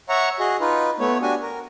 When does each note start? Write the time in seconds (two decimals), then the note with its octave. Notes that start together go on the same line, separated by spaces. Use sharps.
0.09 C#5 E5 F#5 A#5 C#6
0.40 F#4 G#4 D#5
0.60 D#4 F4 B4
0.99 A3 B3 C#5
1.22 D4 F#4 G4 G#5
1.42 A#4